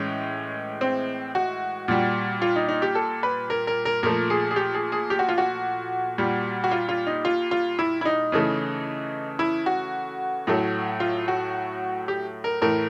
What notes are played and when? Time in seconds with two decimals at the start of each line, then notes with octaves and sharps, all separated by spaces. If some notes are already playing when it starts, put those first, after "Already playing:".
Already playing: A2 E3 G#3 C#4
0.81 C4
1.35 F#4
1.88 A#2 G3
2.42 F4
2.56 D#4
2.69 D#4
2.82 G4
2.95 A4
3.23 B4
3.50 A#4
3.67 A#4
3.85 A#4
4.03 A#2 F3 A3 A#4
4.30 G#4
4.51 G#4
4.56 G4
4.74 G#4
4.92 G#4
5.10 G4
5.19 F#4
5.29 F4
5.38 F#4
6.18 A#2 G3
6.64 F#4
6.71 F4
6.89 F4
7.07 D#4
7.25 F4
7.51 F4
7.79 E4
8.01 E4
8.05 D#4
8.32 C#3 E3 A3
9.39 E4
9.66 F#4
10.47 A2 F#3 A3
11.00 F4
11.28 F#4
12.08 G4
12.44 A#4
12.62 A2 E3 A3 A#4